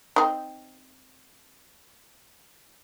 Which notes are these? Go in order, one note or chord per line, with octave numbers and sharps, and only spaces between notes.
C4 D#4